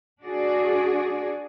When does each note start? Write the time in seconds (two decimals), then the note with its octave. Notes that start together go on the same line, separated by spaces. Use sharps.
0.23 D4 F#4 G#4 D5